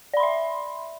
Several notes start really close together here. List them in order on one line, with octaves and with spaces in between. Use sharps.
D5 B5 C6 E5